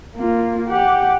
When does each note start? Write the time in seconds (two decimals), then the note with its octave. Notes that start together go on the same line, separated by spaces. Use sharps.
0.16 A#3 F4
0.68 G4 F#5